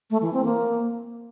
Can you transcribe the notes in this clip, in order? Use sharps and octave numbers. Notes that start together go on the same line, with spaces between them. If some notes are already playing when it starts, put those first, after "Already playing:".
A3
E3
C4
A#3